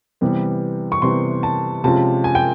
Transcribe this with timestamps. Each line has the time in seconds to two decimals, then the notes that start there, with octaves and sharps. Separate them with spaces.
0.21 C3 E3 G3 B3
0.92 C#6
1.02 C3 E3 G3 B3 C6
1.43 A5
1.84 C3 F3 G#3 C#4 F4 A5
2.24 G#5
2.35 G5